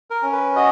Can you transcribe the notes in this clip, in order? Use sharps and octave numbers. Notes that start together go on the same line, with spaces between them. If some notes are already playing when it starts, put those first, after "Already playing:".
A#4
C#4
B4
F#4 D#5